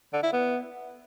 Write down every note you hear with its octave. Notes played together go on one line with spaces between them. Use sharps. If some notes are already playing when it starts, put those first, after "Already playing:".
D3
E4
B3